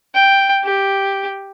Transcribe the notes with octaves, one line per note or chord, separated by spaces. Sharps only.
G5
G4